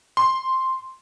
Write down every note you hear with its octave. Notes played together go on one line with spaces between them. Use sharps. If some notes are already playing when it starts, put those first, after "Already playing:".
C6